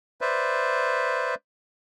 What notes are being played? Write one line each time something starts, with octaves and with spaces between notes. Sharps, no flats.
B4 C5 D5 E5